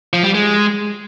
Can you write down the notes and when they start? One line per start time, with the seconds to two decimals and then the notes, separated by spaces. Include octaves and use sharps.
0.13 F3
0.24 G3
0.35 G#3